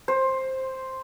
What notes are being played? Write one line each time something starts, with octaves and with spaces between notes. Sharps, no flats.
C5